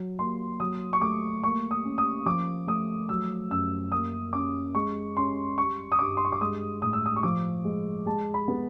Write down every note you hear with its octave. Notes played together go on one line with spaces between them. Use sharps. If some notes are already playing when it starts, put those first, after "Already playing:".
Already playing: F#3
A#3 C6
F#3 D#6
C#6
A3 D6
A#3 C#6
D#6
C#4
D#6
F3 D6
A3 D#6
F#3 E6
F#2 E6
A#3 D#6
C#4 D6
G#3 C#6
C#4 C6
G3 C#6
D#6
G2 D6
C6
C#6
D6
G#3 D#6
A2 D#6
E6
D#6
C#6
F3 D6
G#3
G#3 A5
B5
B3